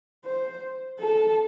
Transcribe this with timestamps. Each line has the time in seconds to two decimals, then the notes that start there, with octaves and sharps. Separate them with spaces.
0.25 C5
1.00 A4